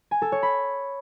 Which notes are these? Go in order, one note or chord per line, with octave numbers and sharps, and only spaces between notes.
G#5
A4
C#5
B5